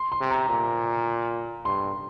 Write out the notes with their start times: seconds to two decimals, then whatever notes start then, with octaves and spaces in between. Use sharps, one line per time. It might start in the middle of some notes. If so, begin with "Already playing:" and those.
Already playing: C6
0.12 C6
0.21 C3
0.30 A#5
0.50 A#2 A#5
1.65 G2 C6